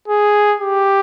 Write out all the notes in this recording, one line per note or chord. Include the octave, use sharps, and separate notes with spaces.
G#4
G4